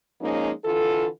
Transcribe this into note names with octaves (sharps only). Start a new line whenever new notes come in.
F3 G#3 A#3 C#4 D#4
D3 E3 F4 A4